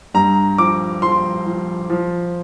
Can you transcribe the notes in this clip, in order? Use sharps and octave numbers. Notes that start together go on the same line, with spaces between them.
G2 A#5
F3 D6
F3 C6
F3
F3